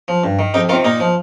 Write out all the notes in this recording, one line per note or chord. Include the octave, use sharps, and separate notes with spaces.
F3
G2
D#3
F2 D#4 G4
C3 D#3 F4 A#4
A#2 A#3 D#4
F3